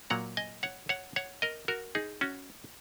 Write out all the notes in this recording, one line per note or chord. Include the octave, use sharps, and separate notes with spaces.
A#2 F#3 A#3 F#5 A#5
D#5 G#5
C#5 F#5
C#5 F#5
C#5 F#5
A#4 D#5
F#4 A#4
D#4 G#4
C#4 F#4